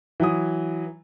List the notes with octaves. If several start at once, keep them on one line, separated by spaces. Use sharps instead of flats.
E3 F#3 D#6